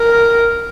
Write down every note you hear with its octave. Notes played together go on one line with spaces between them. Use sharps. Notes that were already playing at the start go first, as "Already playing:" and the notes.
Already playing: A#4